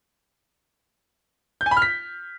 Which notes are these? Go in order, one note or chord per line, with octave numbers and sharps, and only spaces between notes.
G6
G#5
B5
F6
B6